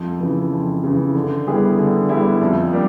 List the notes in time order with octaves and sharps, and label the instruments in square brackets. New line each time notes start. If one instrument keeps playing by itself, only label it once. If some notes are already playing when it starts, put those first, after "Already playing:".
Already playing: [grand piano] F2
C#3 E3
F2
C#3 E3
D3
G3 B3 E4 G#4
D3
G3 B3 E4 G#4
F2
G3 A#3 D4